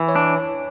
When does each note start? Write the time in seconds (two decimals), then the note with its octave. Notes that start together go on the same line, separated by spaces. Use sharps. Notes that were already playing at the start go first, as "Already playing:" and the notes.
Already playing: E3
0.08 C#5
0.16 D4